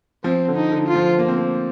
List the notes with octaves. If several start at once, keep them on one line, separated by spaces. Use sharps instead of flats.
F3 C4
D3
D#4
D3
F4
F3
A#3
C4
A#3